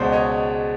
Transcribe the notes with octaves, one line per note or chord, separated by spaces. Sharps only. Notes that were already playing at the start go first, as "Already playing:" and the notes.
Already playing: C#2 B2 G#3 C5 D5
C#5 D#5